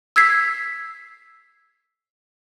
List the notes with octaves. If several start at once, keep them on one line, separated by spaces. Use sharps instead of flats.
E6 G#6 B6 C7